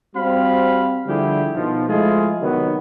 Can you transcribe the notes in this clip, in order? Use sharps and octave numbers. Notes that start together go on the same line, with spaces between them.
G3 C4 F#4 C5 F5 B5
D3 F3 G3 E4 G4 G#4
B2 D#3 F3
F3 G#3 A3 E4 F4 G#4
C3 D#3 F#3 B3